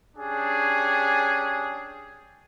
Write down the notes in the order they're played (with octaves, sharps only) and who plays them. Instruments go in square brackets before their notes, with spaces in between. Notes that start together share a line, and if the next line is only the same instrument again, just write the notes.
[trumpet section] C#4 D4 G4 G#4